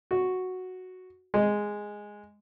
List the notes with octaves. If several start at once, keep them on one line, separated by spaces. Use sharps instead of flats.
F#4
G#3